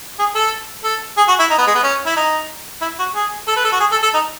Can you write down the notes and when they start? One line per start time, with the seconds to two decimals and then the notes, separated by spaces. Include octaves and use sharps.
0.19 G#4
0.35 A4
0.84 A4
1.17 G#4
1.28 F#4
1.39 E4
1.50 D#4
1.58 B3
1.67 G#3
1.75 B3
1.83 C#4
2.06 E4
2.16 D#4
2.81 E4
2.99 F#4
3.15 G#4
3.47 A4
3.56 B4
3.65 A4
3.72 F#4
3.80 G#4
3.91 A4
4.02 A4
4.14 D#4